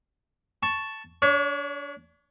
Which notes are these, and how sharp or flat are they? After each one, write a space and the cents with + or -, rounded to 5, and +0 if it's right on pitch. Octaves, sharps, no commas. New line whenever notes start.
A5 +0 C#6 +0
D4 -30 C#5 +20